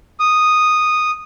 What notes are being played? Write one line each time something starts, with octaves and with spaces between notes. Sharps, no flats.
D#6